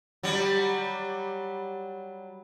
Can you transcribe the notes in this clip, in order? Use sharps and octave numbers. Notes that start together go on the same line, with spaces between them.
F#3 G3